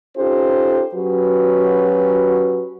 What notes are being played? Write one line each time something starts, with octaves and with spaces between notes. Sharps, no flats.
C#4 D#4 F4 G4 A4 C5
F#3 C#4 F#4 G4 B4